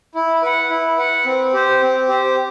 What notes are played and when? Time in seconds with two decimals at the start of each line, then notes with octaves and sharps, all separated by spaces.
0.15 E4
0.42 B4 F#5
0.69 E4
0.97 B4 F#5
1.25 C4
1.53 G4 C5
1.81 C4
2.08 G4 C5